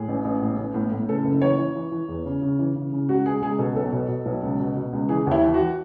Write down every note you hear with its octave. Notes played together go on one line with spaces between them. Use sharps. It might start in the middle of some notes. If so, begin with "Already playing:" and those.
Already playing: A2 G#4
A1
A1
A2
A1
A2
A2
C#3 A4
F#1
E3 C#5
E3
E3
E3
E2
C#3
C#3
E3
C#3
C#3
C#2 F#4
C#2 G#4
C#2 G#4
B2 A4
B1 A4
B2
B2
B1
C#2
B2
B2
C#2
E3 G#4
D#2 E4
E3
F#4
E3